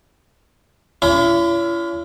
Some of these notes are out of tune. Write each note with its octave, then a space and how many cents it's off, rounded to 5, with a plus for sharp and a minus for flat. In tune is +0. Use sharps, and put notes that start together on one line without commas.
C#4 +40 E4 +45 B5 +0